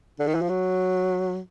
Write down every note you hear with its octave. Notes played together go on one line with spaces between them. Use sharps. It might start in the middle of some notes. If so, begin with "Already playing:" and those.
D3
D#3
E3
F3
F#3